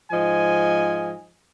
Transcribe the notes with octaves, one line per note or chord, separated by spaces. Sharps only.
G#2 F3 D#5 G#5